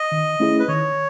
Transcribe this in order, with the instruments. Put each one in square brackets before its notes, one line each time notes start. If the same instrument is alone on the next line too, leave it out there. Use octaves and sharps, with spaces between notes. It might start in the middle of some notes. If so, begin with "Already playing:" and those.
Already playing: [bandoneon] D#5
[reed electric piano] D#3
A3 C#4 E4 G#4
[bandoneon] B4
[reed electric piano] D#3 [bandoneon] C#5